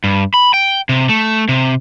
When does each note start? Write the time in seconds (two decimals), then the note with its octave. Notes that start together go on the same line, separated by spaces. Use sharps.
0.04 G2
0.34 B5
0.54 G5
0.89 C3
1.09 A3
1.49 C3